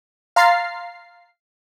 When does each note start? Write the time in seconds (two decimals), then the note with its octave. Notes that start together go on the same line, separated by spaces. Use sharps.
0.36 F5 A#5 C6 F6 A6 C7